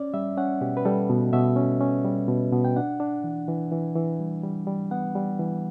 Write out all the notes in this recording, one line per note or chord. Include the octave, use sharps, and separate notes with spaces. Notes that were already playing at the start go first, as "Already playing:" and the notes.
Already playing: C#4 D5
G3 E5
C#4 F#5
B2 G4
B4
G3 A4
B2
B2 E5
C#4
C#4
G3
B2
B2
G5
D4 F#5
D4
E3
E3
E3
E3
G3
G3
G3
B3 F#5
G3
E3